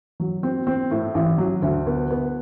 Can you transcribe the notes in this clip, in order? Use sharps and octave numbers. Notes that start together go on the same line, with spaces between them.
F#3
C4
C4
A2
A1
F#3
D2
B3
B3